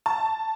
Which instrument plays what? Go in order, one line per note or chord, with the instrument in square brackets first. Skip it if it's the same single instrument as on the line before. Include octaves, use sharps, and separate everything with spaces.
[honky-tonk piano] A5